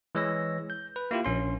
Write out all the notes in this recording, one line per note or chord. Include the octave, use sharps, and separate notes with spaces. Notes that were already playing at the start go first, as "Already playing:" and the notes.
E3 G#3 C#5 E6 A#6
G6
B4
A#3 E4 F4 G4
A#1 C#4 C6